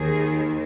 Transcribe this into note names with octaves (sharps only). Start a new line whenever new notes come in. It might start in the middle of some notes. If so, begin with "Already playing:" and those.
Already playing: D#2 D#3 G#4